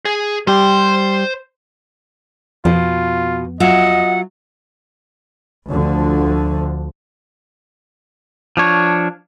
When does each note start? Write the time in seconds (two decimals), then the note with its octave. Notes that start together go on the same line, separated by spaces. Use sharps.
0.05 G#4
0.47 G3 G4 C5 C6
2.65 F2 B2 F4
3.60 F#3 F4 D#5 E5 F#5
5.69 D2 D3 F3
8.57 F3 D4 C#5